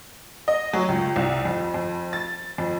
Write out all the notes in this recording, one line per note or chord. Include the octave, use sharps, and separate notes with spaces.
D#5
F#3
C#2
C2
F2
F2
A6
F2